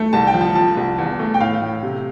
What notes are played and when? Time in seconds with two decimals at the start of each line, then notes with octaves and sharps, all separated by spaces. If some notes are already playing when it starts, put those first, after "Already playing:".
Already playing: A3
0.13 C2 A5
0.27 G5
0.34 F3
0.41 A5
0.55 F3 A5
0.77 C2
0.98 E2
1.19 A3
1.34 G5
1.40 A2 F5
1.61 A2
1.83 C3